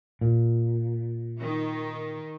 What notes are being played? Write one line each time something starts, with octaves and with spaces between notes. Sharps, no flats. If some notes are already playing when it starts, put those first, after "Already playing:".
A#2
D#3